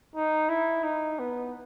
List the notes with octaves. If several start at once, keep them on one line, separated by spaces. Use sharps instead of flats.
D#4
E4
D#4
B3